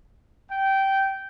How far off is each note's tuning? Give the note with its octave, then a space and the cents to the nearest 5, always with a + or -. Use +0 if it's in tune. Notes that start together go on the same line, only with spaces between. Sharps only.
G5 -15